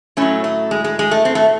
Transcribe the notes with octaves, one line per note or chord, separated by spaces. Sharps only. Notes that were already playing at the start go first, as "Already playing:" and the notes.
A2 F#3 A3 C#4
A3
G#3
G#3
G#3
A3
C4
A3